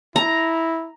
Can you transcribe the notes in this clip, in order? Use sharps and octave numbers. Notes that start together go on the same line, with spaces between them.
E4 A#5